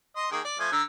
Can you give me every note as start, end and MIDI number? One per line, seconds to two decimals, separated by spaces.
0.16 0.30 75
0.16 0.30 84
0.31 0.40 51
0.31 0.40 58
0.31 0.40 68
0.44 0.55 74
0.59 0.70 53
0.59 0.70 57
0.59 0.70 80
0.72 0.82 50
0.72 0.82 82
0.72 0.82 88